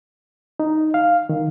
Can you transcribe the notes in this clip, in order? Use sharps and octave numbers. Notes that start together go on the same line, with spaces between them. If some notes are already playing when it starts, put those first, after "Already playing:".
D#4
F5
D#3